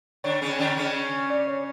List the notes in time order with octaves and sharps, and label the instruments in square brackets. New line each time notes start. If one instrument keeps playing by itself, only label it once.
[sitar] D3 D4 [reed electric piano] C#5
[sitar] C#3 C#4
D3 D4
C#3 C#4
[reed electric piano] D5
C#5